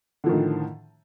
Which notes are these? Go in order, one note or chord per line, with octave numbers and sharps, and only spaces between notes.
A2 D3 D#3 F3